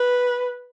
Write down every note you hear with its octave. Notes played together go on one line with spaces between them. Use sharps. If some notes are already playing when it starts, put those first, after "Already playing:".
Already playing: B4